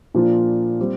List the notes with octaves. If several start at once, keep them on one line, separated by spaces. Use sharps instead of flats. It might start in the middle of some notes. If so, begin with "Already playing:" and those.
A#2 F3 D4 F4
G3 C4